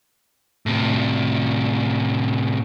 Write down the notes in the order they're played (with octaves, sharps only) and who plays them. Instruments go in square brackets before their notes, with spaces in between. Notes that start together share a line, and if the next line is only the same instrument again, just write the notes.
[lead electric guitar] A2 C3